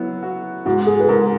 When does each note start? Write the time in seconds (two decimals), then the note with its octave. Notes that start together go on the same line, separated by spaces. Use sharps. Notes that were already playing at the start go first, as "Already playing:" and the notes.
Already playing: F#3 B3 E4
0.23 F#4
0.66 G#2 F#4
0.87 G#4
1.00 B4
1.09 G#2 A#4